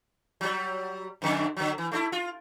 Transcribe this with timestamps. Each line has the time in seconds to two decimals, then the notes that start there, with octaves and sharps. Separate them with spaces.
0.41 F#3 G3
1.22 F2 D3
1.57 D3 F#3
1.78 E3
1.92 A3 D4 E4
2.12 F4